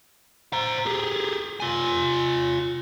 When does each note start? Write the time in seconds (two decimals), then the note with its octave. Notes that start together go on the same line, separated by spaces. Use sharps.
0.53 C5 A#5
0.86 G4 G#4
1.60 F4 G#5